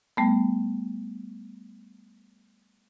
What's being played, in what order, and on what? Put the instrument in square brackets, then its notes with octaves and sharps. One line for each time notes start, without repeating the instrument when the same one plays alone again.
[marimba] G3 A3 B3